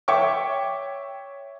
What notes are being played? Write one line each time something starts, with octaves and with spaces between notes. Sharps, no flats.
C#5 E5 G5 C#6 D6